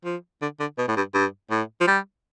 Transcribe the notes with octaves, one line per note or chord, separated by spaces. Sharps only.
F3
D3
D3
B2
A2
G2
G2
A2
F3
G3